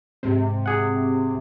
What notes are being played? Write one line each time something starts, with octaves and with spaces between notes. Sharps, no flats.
G#2 C3 G#3 C4
G#4 F#5